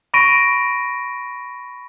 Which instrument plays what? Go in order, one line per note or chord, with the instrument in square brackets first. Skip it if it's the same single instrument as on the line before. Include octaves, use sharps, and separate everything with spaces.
[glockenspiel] B5 C#6 A#6 D7 D#7